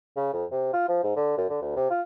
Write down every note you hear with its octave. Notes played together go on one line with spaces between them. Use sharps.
C#3
F2
C3
F4
F3
G#2
D3
F#2
D3
D2
C3
F4